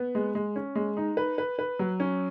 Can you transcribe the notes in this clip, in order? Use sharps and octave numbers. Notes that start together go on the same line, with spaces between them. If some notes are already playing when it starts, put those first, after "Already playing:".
Already playing: B3
G#3
G#3
C#4
G#3
D#4
B4
B4
B4
F#3
C#4